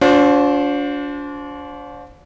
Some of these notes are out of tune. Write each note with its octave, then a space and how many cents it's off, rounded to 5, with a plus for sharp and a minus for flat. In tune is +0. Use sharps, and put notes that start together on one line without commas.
D4 -35 F4 +45 C5 +0